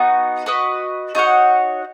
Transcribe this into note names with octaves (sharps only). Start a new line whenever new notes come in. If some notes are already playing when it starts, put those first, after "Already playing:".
Already playing: B3 D#4 F#4
F#4 B4 D#5
D#4 F#4 C#5 F#5